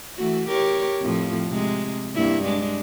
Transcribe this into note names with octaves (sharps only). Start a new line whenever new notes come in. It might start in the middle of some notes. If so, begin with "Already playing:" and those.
E3 A3 F#4
G4 A#4 C#5
F2 A2 F3
C3 G#3
G2 A#3 E4
G#3 D4